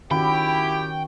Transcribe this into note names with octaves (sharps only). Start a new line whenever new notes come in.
D#3 C#4 E4 F#4 G4 G5 B5